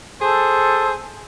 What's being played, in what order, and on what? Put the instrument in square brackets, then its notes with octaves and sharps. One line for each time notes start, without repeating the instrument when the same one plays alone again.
[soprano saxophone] G#4 [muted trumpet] A4 [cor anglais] C5